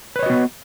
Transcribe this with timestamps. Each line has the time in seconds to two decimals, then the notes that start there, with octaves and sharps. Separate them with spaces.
0.16 B4
0.19 C#5
0.23 D#5
0.26 F#4
0.30 B3